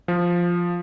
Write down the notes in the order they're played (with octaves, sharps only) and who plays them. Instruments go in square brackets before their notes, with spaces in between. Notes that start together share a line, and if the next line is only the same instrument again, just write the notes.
[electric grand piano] F3